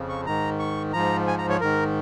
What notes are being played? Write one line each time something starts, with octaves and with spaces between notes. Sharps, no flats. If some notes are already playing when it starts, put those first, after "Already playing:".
Already playing: F2 C#3 F3
C#6
G#2 D#3 A#5
C#6
G#2 F3 A#5
G#5
A#5
C#5
G#2 D#3 A#4